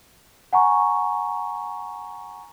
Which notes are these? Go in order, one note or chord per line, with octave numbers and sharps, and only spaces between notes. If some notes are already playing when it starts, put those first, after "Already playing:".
F#5 G#5 A#5 C#6